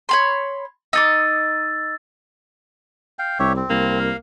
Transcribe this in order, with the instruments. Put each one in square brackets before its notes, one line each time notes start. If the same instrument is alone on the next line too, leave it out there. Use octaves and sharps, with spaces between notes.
[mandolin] C#5 B5 C6
[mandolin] D#4 D#5 D6 [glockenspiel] E6 A6
[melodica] F5 G5
[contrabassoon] C2 [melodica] G4 C#5 E5
[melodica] C4
[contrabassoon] C2 [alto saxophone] A#3
[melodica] F5